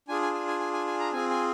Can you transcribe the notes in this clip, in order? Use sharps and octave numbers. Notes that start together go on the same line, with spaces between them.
D4 F4 G#4 G#5
G#5
G#5
G#5
G#5
G#5
G#5
A#5
C4 F4 G#4 G#5
G#5